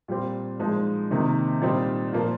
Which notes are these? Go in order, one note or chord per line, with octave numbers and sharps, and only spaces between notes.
A#2 G3 C4
A#2 F3 G#3 D#4
C3 D#3 A#3 D#4
A#2 G3 C4 D#4
A#2 F3 A#3